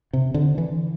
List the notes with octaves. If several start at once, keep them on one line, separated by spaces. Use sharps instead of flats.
C3
D3
E3